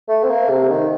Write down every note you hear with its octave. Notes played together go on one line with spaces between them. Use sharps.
A3
C4
A#3
C3
D#3